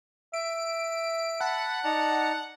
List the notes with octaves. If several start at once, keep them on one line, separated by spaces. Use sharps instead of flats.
E5 D7
F#5 A5 B5
D#4 D5 A5 A#5